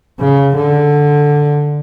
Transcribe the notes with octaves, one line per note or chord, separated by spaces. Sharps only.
C#3
D3